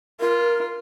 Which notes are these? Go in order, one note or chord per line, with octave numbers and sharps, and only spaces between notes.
F4 A#4